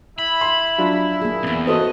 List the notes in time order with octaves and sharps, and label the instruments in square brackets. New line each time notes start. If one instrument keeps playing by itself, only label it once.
[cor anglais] E4 [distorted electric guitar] B5
[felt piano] C6
F#3 D4 F4
[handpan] A#3 G#4
[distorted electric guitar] B1 E2 [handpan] C4
[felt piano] F#4 A4 C5 [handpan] B4 [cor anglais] D#5